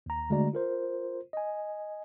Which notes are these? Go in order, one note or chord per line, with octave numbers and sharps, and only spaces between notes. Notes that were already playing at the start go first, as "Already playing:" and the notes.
D#2 A#5
D3 G#3 A3 F#4 D5 A#5
F4 A#4 C5
D#5 G#5